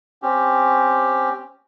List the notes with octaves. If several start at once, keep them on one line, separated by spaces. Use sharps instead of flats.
C4 C#4 G4